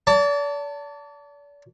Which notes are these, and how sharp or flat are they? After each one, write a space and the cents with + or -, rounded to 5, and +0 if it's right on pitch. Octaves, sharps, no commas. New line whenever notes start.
D5 -40 A5 +20